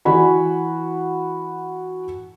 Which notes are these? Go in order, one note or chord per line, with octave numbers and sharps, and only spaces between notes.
E3 F#4 G#5 B5